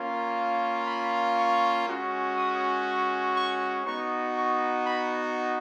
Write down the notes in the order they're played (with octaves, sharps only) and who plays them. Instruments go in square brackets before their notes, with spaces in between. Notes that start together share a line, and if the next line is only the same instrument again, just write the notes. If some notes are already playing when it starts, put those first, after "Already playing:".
Already playing: [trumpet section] A#3 C#4 F4
B5
C#6
G#3 C#4 F#4
D#6
C#6
C#6
B3 D#4 F#4 C#6
C#6
B5